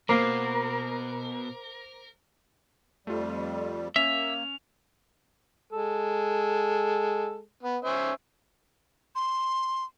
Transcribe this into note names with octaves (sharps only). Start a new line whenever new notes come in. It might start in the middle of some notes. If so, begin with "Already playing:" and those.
B2 A#3 A#4 C5 D6 C7
F2 G3 A3 F4
A#3 C#4 E5 F7
G#3 A4
B3
C#4 C5 E5
C6